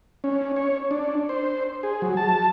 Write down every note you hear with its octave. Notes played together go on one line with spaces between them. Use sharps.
C#4
C#5
D4
C5
G#4
F#3
A5